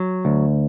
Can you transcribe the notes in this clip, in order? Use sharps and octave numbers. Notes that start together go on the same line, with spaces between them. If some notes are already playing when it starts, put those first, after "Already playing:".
Already playing: F#3
D2